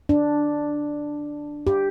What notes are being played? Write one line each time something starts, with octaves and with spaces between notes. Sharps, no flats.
D4
G4